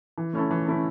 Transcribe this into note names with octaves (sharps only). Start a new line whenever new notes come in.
E3
A3 C#4 E4 A4
E3
A3 C#4 E4 A4